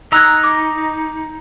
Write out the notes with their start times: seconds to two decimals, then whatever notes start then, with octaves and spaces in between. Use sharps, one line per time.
0.12 D#4 D#5 A#5 E6 F#6 G#6
0.44 D6